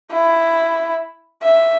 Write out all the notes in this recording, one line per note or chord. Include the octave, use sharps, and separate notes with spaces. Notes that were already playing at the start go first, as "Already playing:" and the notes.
E4
E5